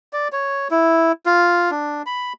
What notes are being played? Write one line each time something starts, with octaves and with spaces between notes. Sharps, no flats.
D5
C#5
E4
F4
D4
B5